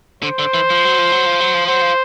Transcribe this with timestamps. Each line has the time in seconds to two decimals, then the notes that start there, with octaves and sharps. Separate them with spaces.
0.22 D3 C5
0.39 D3
0.54 E3
0.70 F3
0.85 F#3
0.98 F3
1.12 F#3
1.26 F3
1.40 F#3
1.54 F3
1.66 F#3 C5
1.82 F3